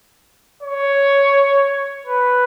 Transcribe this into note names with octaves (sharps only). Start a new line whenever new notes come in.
C#5
B4